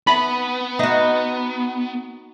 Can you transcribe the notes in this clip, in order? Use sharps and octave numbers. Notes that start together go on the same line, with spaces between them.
B3 D#4 E5 B5
D#4 F#4 E5 F#5